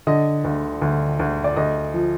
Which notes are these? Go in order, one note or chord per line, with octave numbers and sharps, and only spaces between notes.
D3 D#5
D2
D2
D2
D5
D2 D#5
F3